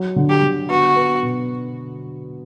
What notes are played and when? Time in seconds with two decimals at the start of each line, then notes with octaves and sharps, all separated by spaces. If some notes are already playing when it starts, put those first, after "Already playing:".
Already playing: F#3
0.16 D3
0.29 G4
0.43 D3
0.69 B3 F#4
0.96 B3
1.23 B2